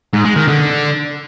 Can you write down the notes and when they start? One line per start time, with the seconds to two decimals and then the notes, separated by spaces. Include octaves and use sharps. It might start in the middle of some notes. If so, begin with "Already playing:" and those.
0.13 G#2
0.25 G#3
0.36 D#3
0.48 D3